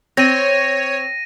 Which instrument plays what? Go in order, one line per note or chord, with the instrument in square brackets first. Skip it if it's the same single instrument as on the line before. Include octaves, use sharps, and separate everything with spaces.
[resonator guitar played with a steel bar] C4 [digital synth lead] C#5 [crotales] A#6 D#7